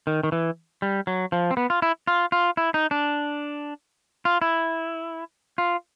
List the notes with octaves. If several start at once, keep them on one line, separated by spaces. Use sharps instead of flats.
D#3
D#3
E3
G3
F#3
F3
C4
B3
F4
E4
F4
F4
E4
D#4
D4
F4
E4
F4